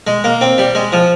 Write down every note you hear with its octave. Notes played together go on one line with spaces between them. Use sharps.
G#3
A#3
C4
G3
G#3
F3